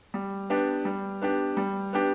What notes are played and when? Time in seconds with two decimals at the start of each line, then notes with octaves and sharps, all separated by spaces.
0.14 G3
0.50 B3 D4 G4
0.85 G3
1.21 B3 D4 G4
1.57 G3
1.93 B3 D4 G4